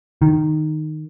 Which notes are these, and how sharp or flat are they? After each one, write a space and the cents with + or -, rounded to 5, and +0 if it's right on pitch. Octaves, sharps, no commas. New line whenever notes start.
D#3 -10